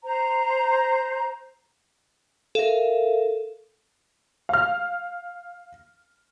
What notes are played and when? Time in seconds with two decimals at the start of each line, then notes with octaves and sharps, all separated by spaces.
0.04 C5 A#5
2.55 A4 A#4 E5 F5
4.49 F5 F6